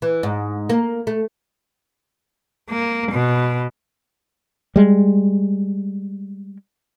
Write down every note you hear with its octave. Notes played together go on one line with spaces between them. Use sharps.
E3
G#2
A#3
A3
A#3
B2
G3 G#3